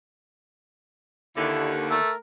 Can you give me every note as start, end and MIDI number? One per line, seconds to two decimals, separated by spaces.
1.36 1.95 39
1.36 1.95 50
1.36 1.74 64
1.91 2.10 57
1.91 2.17 70